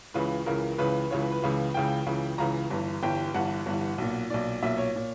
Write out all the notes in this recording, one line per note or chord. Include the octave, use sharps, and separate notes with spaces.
C#2 C#3 E3 B4
C#2 C#3 E3 A#4
C#2 C#3 E3 B4
C#2 C#3 E3 C#5
B4
B4
C#2 C#3 E3
C#2 C#3 E3 G5
C#2 C#3 E3
C#2 C#3 E3 A#5
G1 G2 E3
G1 G2 E3 G5
G1 G2 E3 F#5
G1 G2 E3
B1 A#2
B1 A#2 D5
B1 A#2 E5
C#5
A#2